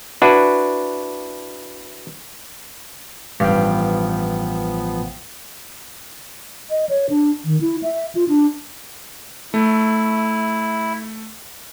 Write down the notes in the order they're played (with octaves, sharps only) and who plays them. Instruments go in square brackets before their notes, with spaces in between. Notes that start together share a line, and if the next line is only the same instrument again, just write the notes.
[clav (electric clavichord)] D4 E4 F#4 B4
[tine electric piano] A1 F5 G5 [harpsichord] G2 [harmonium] F3 B3
[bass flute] D#5
C#5
D4
D#3
E4
E5
F4
D4
[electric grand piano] A3 [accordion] E4